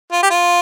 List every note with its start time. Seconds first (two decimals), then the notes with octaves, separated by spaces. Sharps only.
0.12 F4
0.23 G4
0.30 F4